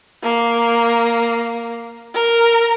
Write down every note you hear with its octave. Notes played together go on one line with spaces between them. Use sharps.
A#3
A#4